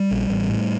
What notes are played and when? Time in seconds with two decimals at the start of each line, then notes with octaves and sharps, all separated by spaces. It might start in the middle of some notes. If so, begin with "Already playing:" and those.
Already playing: G3
0.11 A#1
0.30 A1
0.49 A2